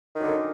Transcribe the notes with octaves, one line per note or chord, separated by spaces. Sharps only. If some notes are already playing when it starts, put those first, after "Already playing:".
F#2 D3 D#3